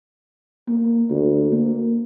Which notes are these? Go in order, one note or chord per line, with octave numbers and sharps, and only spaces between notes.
A#3
D2
A#3